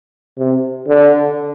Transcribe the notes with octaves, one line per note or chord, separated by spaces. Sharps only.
C3
D3